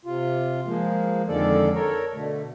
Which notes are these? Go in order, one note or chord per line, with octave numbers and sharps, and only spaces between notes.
C3 F4
F3 G#3 A#3
F2 D3 D#3 G#3 A4 D5
A4 A#4 C#5
B2 D3 A3